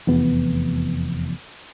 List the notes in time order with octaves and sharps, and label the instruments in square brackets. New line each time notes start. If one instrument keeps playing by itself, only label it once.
[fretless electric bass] F1 E2 B3